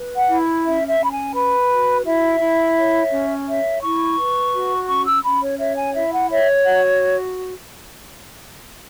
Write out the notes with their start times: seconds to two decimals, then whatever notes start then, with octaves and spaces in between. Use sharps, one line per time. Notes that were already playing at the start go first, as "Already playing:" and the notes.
Already playing: B4
0.16 F#5
0.29 E4
0.64 C#4 E5
0.87 E5
0.99 C#4 B5
1.10 G#5
1.34 B4 B5
1.70 F#4
2.05 E4 E5
2.41 E4
2.77 C#5
3.12 C#4
3.46 C#5 E5
3.82 E4 C#6
4.18 B4
4.52 F#4
4.88 C#4 C#6
5.05 E6
5.23 C#4 B5
5.42 C#5
5.59 C#5 E5
5.76 G#5
5.94 E4 E5
6.13 F#5
6.30 C#5 E5
6.65 F#4 F#5